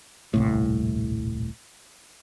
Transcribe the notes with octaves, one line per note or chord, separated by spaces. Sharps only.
D#1 C2 A2